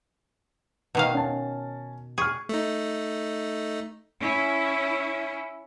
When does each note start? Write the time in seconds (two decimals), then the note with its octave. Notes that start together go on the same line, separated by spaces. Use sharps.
0.95 B2 D#3 F5
1.14 C#4 A5
2.18 G#4 C#6 F6
2.49 A3 D#4
4.21 C#4 E4